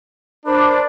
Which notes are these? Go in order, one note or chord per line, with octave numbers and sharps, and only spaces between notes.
D4 A#4 C5 B5